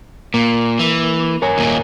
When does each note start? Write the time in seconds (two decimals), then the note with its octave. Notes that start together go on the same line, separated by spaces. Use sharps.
0.34 A#2 A#3
0.79 E3
1.42 A#4 C#5 G#5
1.58 D#2 A#2